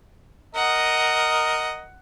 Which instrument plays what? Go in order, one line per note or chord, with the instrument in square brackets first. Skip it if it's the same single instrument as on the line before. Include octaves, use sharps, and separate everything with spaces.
[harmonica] A#4 D#5 [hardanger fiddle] F#5